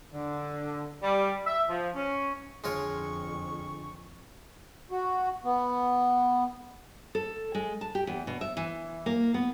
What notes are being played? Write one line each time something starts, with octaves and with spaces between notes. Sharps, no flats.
D3
G3
E5
F3
C#4
F2 D3 G#3 F4 G#4 C#5 C#6
F#4
B3
A4
G#3
A5
G4
E2
B2
E5
E3
A#3
B3